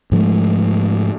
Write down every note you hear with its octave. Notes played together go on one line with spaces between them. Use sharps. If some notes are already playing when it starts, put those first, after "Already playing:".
G#2 F3 G#3 A3